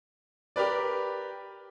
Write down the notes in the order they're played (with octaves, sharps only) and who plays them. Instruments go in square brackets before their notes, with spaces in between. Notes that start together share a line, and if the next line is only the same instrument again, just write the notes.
[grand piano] G4 A#4 B4 D5